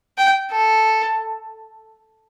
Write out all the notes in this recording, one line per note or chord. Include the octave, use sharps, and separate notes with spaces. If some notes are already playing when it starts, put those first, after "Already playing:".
G5
A4